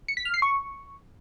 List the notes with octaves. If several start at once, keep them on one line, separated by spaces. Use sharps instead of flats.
C#7
B6
F6
C7
C#6